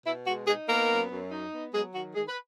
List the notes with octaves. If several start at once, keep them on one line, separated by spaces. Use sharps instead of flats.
B2 E4
G#3 F#4
G#3 D#4 G#4
A#3 B3 A#4
F#2
F#2
D#4
B3
F#3 G#3 G#4
D#3 F#4
D#3 G#3 G#4
B4